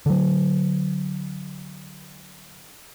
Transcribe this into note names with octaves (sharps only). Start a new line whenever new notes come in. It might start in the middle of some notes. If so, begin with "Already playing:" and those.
D3 F#3